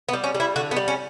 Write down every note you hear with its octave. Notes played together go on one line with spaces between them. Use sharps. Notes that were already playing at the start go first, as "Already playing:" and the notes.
B3
G3
C#4
G3
E4
D3 F#4
B3
G3
C#4